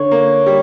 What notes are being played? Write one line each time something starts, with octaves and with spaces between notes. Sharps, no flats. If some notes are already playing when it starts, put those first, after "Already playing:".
Already playing: D3 C#5
A#3
G3